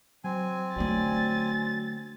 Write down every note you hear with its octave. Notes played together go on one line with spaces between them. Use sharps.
F#3 C4 G#5
D3 F#3 A3 D5 A6